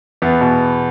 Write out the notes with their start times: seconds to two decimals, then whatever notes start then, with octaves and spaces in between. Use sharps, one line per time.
0.22 E2 B3
0.41 B2